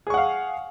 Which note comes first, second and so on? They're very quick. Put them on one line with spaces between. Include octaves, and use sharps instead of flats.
G#4 C#6 F#5 F5